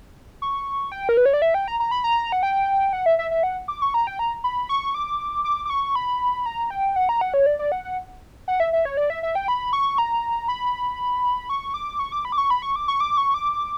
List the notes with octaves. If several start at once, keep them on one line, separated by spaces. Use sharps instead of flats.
C#6
G5
A#4
B4
C#5
D5
E5
G5
A#5
A#5
B5
A#5
F#5
G5
F#5
E5
E5
E5
F#5
D6
C#6
A#5
G5
A#5
B5
C#6
D6
D6
D6
C#6
B5
A#5
G5
F#5
A#5
F#5
C#5
D5
D5
F#5
F#5
F#5
E5
E5
C#5
D5
E5
E5
G5
B5
C#6
A#5
B5
C#6
D6
C#6
D6
B5
D6
C#6
B5
C#6
D6
C#6
D6
C#6
D6